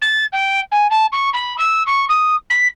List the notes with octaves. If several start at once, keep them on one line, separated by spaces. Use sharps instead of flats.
A6
G5
G#5
A5
C#6
B5
E6
C#6
D#6
B6